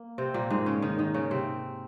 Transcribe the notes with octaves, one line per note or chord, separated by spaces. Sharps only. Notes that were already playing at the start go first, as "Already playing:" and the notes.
Already playing: A#3
C3 C4
A#2 A#3
G#2 G#3
C#3 C#4
D#3 D#4
D#3 D#4
C#3 C#4
C3 C4